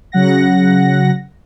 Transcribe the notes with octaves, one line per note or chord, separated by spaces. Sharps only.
C#3 F#3 F#5 A#6